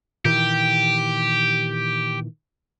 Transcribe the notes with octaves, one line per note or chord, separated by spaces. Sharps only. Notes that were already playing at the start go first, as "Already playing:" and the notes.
A#2 D#3 E3 G4